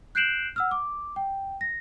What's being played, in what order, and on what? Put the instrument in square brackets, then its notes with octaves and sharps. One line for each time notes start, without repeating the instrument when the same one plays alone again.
[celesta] F#6 G6 C7 D7 E7 F#7
F#5 E6 F6
D6
G5
A#6